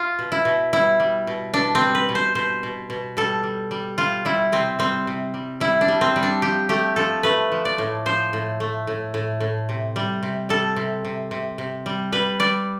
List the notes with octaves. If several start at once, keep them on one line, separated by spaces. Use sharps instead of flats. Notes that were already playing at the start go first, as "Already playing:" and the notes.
Already playing: F4
B2
E4
B2
G3 E4
G3
B2
B2 D4
C4
G3
B4
B2
C5
B2 C5
B2
B2
G3 A4
G3
G3
G3 F4
G3 E4
C3 C4
G3 C4
C3
G3
G3 E4
D4
G3
C4
G3
D4
F3 G4
A3 G4
F3 A4
A3 B4
F3
D5
A2
F3 C5
A2
A3
A2
A2
A2
C3
G3
C3
G3 A4
C3
C3
C3
C3
G3
G3 B4
G3 D5